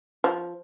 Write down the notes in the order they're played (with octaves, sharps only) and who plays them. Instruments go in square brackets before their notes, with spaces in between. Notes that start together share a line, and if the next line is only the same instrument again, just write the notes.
[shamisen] F3